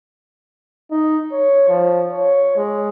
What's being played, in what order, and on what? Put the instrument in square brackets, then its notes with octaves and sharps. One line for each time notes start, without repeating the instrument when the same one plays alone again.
[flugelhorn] D#4
C#5
F3
C#5
G#3